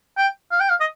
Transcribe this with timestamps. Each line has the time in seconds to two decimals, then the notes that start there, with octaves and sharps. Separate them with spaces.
0.17 G5
0.52 F5
0.60 G5
0.70 F5
0.80 D#5